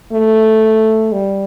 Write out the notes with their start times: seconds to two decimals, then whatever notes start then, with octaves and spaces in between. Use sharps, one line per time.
0.12 A3
1.12 G3